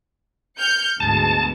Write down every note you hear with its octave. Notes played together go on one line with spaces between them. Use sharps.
F6 G6 C#7
D2 G#2 B2 A5